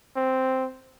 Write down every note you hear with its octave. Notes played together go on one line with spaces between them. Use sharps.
C4